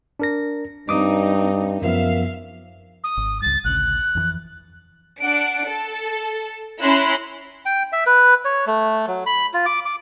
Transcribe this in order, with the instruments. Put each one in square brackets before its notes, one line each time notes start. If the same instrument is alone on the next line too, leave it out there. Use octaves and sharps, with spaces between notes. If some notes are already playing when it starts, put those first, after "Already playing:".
[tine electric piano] D4 A#4 A#6
[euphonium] G2 [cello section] C4 D#4 [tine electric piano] D6 D#6
[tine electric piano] F#2 F3 B3 [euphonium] A#4 [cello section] E5 F5
[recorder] D#6
[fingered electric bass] G#1
[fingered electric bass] C#2 G2 [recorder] A6
[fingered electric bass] A1 D2 C#3 [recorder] F#6
[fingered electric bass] F2 C#3 E3
[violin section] D4 F#5 D7
A4
C#4 E4 A#5 C6 F#6
[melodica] G5
E5
B4
C#5
A3
F#3
B5
F4
D6
D6